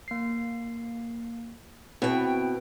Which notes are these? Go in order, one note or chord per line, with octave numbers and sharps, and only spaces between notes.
A#3 C7
B2 C4 E4 B4 G5